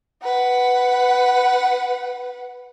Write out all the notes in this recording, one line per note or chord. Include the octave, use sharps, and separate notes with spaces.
B4 F#5